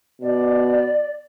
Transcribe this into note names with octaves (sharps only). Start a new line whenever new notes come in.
B2 D5